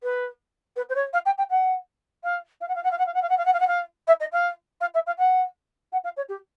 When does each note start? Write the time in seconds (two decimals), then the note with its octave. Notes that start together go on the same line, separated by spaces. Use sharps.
0.03 B4
0.76 B4
0.89 C5
0.95 C#5
1.13 F5
1.26 G5
1.38 G5
1.50 F#5
2.24 F5
2.61 F5
2.68 F#5
2.75 F5
2.83 F#5
2.91 F5
2.98 F#5
3.06 F5
3.14 F#5
3.22 F5
3.29 F#5
3.37 F5
3.45 F#5
3.53 F5
3.60 F#5
3.67 F5
4.07 E5
4.20 D#5
4.32 F5
4.81 F5
4.94 E5
5.06 F5
5.18 F#5
5.92 F#5
6.04 F5
6.17 C#5
6.29 G4